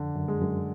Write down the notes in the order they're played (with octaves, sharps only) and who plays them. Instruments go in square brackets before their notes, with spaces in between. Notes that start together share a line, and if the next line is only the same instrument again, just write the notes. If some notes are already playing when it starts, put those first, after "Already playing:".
Already playing: [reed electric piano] F2 [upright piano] D3
[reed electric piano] F#2
[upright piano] G#3
[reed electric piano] F#2